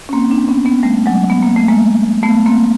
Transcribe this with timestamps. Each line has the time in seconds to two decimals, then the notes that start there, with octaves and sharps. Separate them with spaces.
0.09 C#4
0.13 A#3 C4
0.30 C4 D4
0.48 B3 C#4
0.65 B3 C#4
0.83 G3 A3
1.06 F#3 G#3
1.30 B3
1.42 A#3
1.56 A3
1.68 G#3 A#3
2.23 A3 B3
2.46 A#3 C4